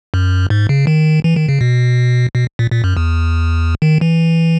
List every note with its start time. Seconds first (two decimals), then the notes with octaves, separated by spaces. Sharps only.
0.14 F#2
0.50 G#2
0.69 C#3
0.87 D#3
1.24 E3
1.36 D#3
1.49 C#3
1.61 B2
2.35 B2
2.59 A#2
2.71 A#2
2.84 F#2
2.97 E2
3.82 D#3
4.01 E3